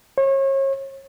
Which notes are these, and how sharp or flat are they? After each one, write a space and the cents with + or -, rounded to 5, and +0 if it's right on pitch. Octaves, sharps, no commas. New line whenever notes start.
C#5 -35